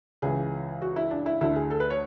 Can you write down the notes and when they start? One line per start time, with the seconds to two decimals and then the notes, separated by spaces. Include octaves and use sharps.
0.22 C#2 C#3 E3 G#4
0.82 F#4
0.96 E4
1.11 D4
1.26 E4
1.41 D2 D3 A3 E4
1.56 G#4
1.70 A4
1.80 B4
1.90 C#5